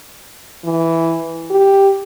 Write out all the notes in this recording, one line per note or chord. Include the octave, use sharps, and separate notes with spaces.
E3
G4